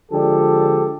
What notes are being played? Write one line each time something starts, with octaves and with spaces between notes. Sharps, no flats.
D3 F3 G#3 D4 G4 A4